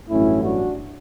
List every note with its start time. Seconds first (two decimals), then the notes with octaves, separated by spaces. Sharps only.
0.10 A1 G2 F#3 A3 C#4 E4
0.44 D4 F#4